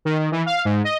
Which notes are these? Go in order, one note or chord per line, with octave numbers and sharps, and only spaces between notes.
D#3
D#3
E3
F5
G#2
D#5